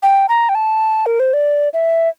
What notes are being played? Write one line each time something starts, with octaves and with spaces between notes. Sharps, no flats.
G5
A#5
G5
A5
A#4
C5
D5
E5